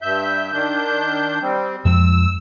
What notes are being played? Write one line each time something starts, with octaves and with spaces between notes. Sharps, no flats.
G2 E5 G6
D#3 D4 G6
G3 C4
F2 F3 G#3 E6